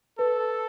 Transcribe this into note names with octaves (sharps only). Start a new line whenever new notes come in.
A4 B4